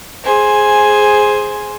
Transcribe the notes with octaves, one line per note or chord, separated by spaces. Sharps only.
G#4 C5 G#5